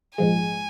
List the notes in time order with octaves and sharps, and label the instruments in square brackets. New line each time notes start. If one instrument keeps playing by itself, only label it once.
[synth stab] A#1 G#2 F3 G#3 [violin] G#5